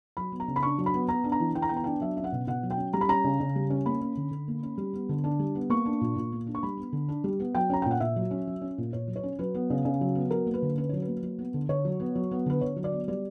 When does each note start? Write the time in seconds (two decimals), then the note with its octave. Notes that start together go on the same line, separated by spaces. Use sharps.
0.17 F#3 B5
0.32 B3
0.40 A#5
0.48 C#3
0.56 B5
0.63 D4 C#6
0.78 F#3
0.86 B5
0.94 B3
1.09 B3 A#5
1.24 D4
1.32 A#5
1.40 E3
1.55 E3 G5
1.62 A#5
1.69 B3 G5
1.77 A#5
1.84 D4 G5
2.01 F#3 E5
2.16 C#4 E5
2.24 F#5
2.32 B2
2.47 B2 F#5
2.63 F#3
2.71 G5
2.78 C#4
2.93 G3 A#5
3.01 B5
3.09 C#4 A#5
3.24 C#3
3.40 C#3
3.56 G3
3.70 C#4
3.85 A#3 B5
4.01 C#4
4.17 D3
4.31 D3
4.48 A#3
4.63 C#4
4.78 G3
4.94 B3
5.09 D3
5.24 D4
5.39 G3
5.55 B3
5.70 A#3 C#6
5.86 D4
6.01 A#2
6.16 A#2
6.32 A#3
6.47 D4
6.55 C#6
6.63 G3 B5
6.77 B3
6.93 D3
7.09 D4
7.24 G3
7.40 B3
7.55 F#3 G5
7.70 C#4 A#5
7.82 A#2 G5
7.91 F#5
8.00 A#2 E5
8.16 F#3
8.31 C#4
8.47 F#3
8.61 C#4
8.78 A#2
8.93 A#2 C#5
9.08 F#3
9.16 C#5
9.23 C#4
9.39 F#3 B4
9.54 B3
9.70 C#3
9.85 C#3
10.01 F#3
10.15 B3
10.31 F#3 A#4
10.46 A#3
10.54 B4
10.62 D3
10.78 C#4 B4
10.89 F#3 C#5
11.02 B4
11.08 A#3
11.23 F#3
11.39 B3
11.54 D3
11.69 D3 C#5
11.85 F#3
12.00 B3
12.15 F#3
12.31 B3
12.46 D3 B4
12.61 D3 C#5
12.76 F#3
12.84 D5
12.92 B3
13.08 G3 D5